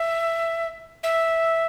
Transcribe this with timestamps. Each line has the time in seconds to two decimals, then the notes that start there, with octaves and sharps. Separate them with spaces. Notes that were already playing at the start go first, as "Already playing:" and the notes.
Already playing: E5
1.03 E5